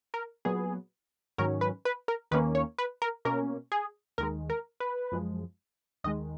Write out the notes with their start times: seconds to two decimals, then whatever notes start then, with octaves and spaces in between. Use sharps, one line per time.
0.14 A#4
0.45 A#2 F#3 B3 G#4
1.38 G#2 D#3 F#3 C#4 A#4
1.61 B4
1.85 B4
2.08 A#4
2.31 D#2 D#3 A#3 C#4 B4
2.55 C#5
2.78 B4
3.02 A#4
3.25 B2 A#3 C#4 A#4
3.72 G#4
4.18 D#2 D#3 G#3 A#4
4.50 A#4
4.80 B4
5.12 F#2 F3 G#3
6.04 D#2 D#3 G#3 D#5